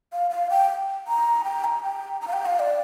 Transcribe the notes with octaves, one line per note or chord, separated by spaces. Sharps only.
F5
F5
G5
A#5
G5
A#5
G5
A#5
F5
G5
F5
D5